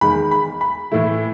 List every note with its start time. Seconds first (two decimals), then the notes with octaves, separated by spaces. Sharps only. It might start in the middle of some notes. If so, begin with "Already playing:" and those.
0.01 E2 D#3 G#3 B5
0.31 B5
0.61 B5
0.92 A2 E3 A3 E4